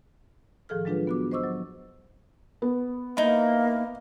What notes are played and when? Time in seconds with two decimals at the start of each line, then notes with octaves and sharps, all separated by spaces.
0.69 A2 D#3 F3 G#4 A4 F6
0.85 F#3 G#3 D4 F4 G#4 B4
1.07 B3 F#4 D6
1.31 C5 D#5 C#6 D6 E6
1.44 F#3
2.62 B3
3.17 A#3 D#4 E4